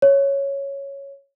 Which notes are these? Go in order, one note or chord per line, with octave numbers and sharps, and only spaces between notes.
C#5